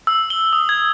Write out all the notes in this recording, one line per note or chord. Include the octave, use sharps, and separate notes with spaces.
E6
G7
D#6
G#6